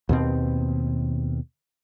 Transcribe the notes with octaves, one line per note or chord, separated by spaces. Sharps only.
D#2 B2 C4